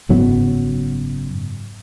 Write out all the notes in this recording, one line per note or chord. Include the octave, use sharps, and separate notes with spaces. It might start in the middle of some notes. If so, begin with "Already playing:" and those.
F#1 G#2 F#3 B3